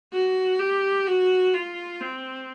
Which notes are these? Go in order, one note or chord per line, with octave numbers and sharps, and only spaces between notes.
F#4
G4
F#4
F4
C4